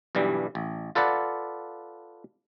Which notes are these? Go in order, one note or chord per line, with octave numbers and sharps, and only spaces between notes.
B1 G2 E3 G3
A1
F4 A4 B4 D5 F#5